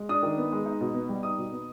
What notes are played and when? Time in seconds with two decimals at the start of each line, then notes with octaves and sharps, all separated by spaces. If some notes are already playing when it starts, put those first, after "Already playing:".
Already playing: G#3
0.09 D4 D#6
0.23 D#3
0.37 B3
0.52 G#3
0.66 D#4
0.81 B2
0.94 B3
1.09 G3
1.23 D#4 D#6
1.38 B2
1.52 B3